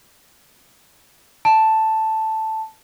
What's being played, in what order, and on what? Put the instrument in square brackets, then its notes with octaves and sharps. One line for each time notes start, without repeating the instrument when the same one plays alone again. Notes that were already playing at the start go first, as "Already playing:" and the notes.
[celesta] A5